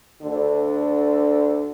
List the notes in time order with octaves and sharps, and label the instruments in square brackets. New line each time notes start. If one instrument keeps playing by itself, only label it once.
[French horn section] D2 D3